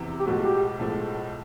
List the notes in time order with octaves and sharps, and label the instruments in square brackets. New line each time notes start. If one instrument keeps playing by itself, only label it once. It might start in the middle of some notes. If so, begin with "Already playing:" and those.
Already playing: [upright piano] F1 E2 C3 E3
[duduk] G4
[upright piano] B1 A2 F3 G#3 [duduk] F#4
[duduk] G4
[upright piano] B1 A2 F3 G#3